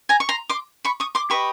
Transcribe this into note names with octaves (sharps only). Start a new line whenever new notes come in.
G#5 A#5
C#6
A#5 C6
C6 D6
B5 C#6
C#6 D#6
C6 D6
G4 B4 D#5 B5 C#6